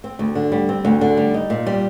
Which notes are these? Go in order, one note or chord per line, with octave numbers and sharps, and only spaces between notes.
C4
D2
D3
G3
C4
D2
D3
G3
D#4
A#2
G3